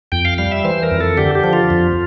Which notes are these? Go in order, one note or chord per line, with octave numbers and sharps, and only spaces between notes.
F2 G5
F5
G3 F5
E5
E3 C5
A#4
F2
A4
D3 G4
G4
F3
F4
F2